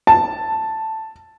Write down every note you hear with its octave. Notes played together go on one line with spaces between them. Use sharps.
A5